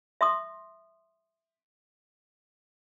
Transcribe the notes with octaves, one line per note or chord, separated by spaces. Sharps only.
E5 C6 D#6